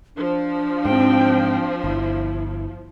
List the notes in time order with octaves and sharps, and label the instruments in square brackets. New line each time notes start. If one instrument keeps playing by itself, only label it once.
[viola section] F3 [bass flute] D4
[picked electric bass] G#2 [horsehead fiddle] C4 G5
[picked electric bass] G1 [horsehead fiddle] E4